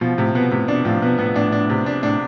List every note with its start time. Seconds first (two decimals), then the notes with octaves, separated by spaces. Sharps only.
0.01 B2 F3
0.18 A2 C3
0.35 B2 B3
0.51 A2 C3
0.68 B2 D4
0.85 A2 F3
1.02 B2 B3
1.19 A2 B3
1.36 A2 D4
1.52 D4
1.70 C3
1.86 D4
2.03 A2 D4